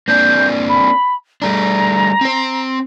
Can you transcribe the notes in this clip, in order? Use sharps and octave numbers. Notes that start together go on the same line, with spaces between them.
A#3 C4 D4 G6
B5
G3 A3 D4 A#5
C4 C5